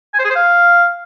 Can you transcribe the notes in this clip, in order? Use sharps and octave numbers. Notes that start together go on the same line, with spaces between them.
G#5
C5
G#4
C5
F5